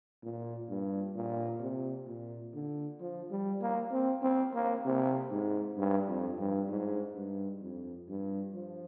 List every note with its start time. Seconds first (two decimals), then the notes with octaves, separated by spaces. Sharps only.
0.23 A#2
0.69 G2
1.16 A#2
1.61 C3
2.07 A#2
2.54 D3
3.00 F3
3.31 G3
3.61 A#3
3.91 C4
4.22 C4
4.54 A#3
4.85 C3
5.31 G#2
5.77 G2
6.08 F2
6.39 G2
6.69 G#2
7.15 G2
7.61 F2
8.08 G2
8.54 F3